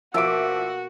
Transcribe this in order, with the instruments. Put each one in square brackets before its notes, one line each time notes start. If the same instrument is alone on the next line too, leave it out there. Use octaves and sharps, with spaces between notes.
[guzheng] B2 A#3 [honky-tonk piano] F3 E5 D6 [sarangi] F#4 [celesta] E6 D7